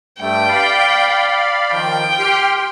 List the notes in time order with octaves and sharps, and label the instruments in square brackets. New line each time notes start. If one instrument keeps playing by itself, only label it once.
[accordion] G2 G3 A3 [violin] G5
[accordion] D5 F5 B5
[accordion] D#3 F3 [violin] G5
[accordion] G4 C6 F6